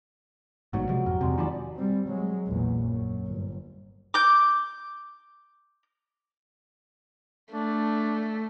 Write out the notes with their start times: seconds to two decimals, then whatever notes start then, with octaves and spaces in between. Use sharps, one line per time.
0.73 A1 G#2 B2 F#3
0.89 C3 F3 G#3
1.06 F2 G#2 A#4 G5
1.21 E2 C3 G#3 A#5
1.38 D#3 F3 D5 A5 B5
1.76 G3 C4
2.08 F#3 G#3
2.47 A#1 E2
2.84 F#2
3.27 G1
4.14 D6 G6
7.52 A3 D4